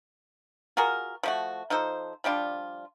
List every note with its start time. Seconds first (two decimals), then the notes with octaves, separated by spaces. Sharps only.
0.77 F4 F#4 G#4 A#4
1.23 F3 A3 F#4
1.70 F3 D#4 A4 C5
2.24 F3 G3 D4 F4